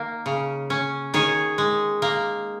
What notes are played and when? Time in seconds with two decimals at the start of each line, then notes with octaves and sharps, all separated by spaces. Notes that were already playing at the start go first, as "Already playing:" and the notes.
Already playing: D#3 A#3
0.26 C#3
0.70 C#4
1.14 D#3 G#4 C#5
1.58 G#3
2.02 A#3